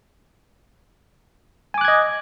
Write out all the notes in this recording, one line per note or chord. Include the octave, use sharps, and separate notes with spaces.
D#5 G#5 D6 F#6 G#6